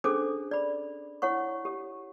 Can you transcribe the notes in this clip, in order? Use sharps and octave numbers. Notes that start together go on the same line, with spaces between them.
C#4 D4 G#4 A4 C5 D6
D5 B5
E4 C#5 F#5 C#6
G4